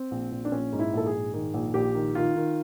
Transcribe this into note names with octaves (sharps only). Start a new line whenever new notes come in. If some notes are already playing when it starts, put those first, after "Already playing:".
Already playing: C4
A#1
A#1
D4
A#1 C#4
G#2
E4
A#1 A4
G#4
G#2
D#3 G#4
A#1
A#1 G4
D#3
D#3 F4
D#3